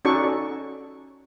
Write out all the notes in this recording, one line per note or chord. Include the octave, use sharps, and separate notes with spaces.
C#4 D#4 F#4 A4 D5 C#6